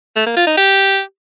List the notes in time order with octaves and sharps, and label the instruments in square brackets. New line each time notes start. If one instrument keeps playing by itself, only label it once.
[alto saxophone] A3
A#3
F4
D#4
G4